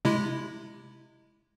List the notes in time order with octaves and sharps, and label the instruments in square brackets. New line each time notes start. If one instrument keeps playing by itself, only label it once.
[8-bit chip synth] C3 G#3 E4